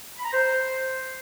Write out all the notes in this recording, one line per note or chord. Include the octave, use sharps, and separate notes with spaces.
B5
A#5
C5